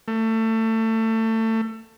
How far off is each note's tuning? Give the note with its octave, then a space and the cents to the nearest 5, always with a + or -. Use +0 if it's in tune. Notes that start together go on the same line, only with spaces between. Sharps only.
A3 +25